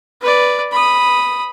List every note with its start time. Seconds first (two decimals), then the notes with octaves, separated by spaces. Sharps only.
0.21 B4 D5
0.72 B5 D#6